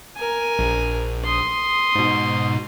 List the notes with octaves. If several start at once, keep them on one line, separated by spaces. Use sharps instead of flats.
A#4 G#5
A#1
C6 D#6
G#2 B2